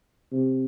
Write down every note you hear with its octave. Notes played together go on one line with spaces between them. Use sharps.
C3